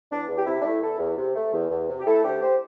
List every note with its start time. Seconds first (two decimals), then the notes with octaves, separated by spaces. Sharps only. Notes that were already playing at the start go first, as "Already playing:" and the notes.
0.11 E2 D4
0.29 E2
0.37 G4
0.46 C3 E4
0.60 D4
0.64 A3 E4
0.82 E2 E4 A4
0.99 E2
1.17 C3
1.35 A3
1.53 E2
1.71 E2
1.89 C3
2.00 G4
2.06 A3 E4 A4
2.24 D2 G4 C5
2.42 G4 C5